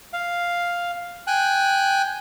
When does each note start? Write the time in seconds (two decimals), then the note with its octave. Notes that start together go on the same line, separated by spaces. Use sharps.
0.13 F5
1.27 G5 G#5 F#6